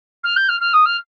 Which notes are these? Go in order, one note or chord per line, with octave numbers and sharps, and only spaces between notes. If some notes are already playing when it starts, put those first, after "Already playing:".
F6
G6
F6
F6
D#6
F6